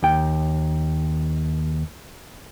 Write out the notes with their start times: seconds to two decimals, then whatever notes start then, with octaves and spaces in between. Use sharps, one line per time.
0.02 D#2 G5